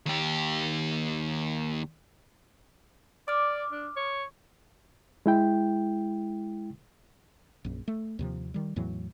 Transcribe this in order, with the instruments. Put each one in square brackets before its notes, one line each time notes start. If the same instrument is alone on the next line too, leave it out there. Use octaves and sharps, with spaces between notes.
[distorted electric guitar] D#2 G4
[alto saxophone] D5 [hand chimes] D6 F6
[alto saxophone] D4
C#5
[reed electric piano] G#3 E4 G5
[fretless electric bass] A#1 F#2
A3
D#2 C3 F3
D#3 G3
E2 A2 E3 F#3